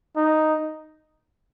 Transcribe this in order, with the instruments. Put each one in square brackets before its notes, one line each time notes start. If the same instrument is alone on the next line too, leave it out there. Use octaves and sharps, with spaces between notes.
[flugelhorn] D#4